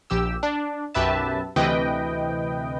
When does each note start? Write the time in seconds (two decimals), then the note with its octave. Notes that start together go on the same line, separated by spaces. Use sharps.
0.10 A#1 G4 E6
0.43 D4
0.94 B1 F#2 G4 B4 E5 A5
1.56 D2 C3 E3 B4 D#5 G5